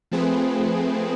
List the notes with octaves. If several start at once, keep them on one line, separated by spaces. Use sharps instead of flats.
F3 A3 C4 G#4 B4